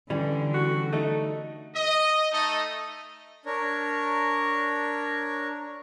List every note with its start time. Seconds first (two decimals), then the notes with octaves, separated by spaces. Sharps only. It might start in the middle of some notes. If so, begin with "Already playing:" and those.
0.10 D3 E3 G3 C#4
0.54 F#4
0.93 A3 D#4
1.75 D#5
2.32 A3 D#4 A4 D#5
3.46 D4 A#4 C#5